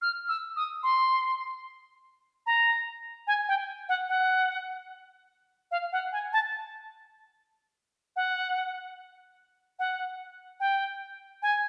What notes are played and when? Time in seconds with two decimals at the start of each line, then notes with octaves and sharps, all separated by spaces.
0.02 F6
0.29 E6
0.56 D#6
0.83 C6
2.46 A#5
3.27 G#5
3.48 G5
3.89 F#5
4.09 F#5
5.71 F5
5.92 F#5
6.12 G#5
6.33 A5
8.16 F#5
9.79 F#5
10.60 G5
11.42 G#5